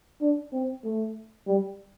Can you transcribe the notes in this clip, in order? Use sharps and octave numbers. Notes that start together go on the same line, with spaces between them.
D4
C4
A3
G3